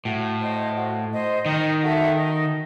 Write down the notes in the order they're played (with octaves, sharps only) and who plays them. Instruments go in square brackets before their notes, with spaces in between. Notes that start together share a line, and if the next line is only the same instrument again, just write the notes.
[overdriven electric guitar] A2 [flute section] F#4
[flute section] C5 D#5
F#4
C5 D#5
[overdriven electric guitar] D#3 [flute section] D#4
[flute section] F#4 A4 E5
D#4